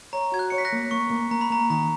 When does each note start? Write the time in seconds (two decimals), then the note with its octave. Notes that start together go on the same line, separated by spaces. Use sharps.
0.13 C#5 A#5
0.32 F#4 G#6
0.39 F#6
0.50 C#5 C#7
0.58 B6
0.65 F#6 A#6
0.72 A#3
0.91 A#3 C#6
1.11 A#3
1.31 A#3 A#5
1.41 B5
1.50 A#3 A#5
1.70 D#3 A#5